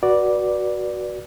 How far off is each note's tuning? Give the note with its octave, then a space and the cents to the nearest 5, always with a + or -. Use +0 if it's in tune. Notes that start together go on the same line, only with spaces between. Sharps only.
F#4 +5 B4 -30 D5 +0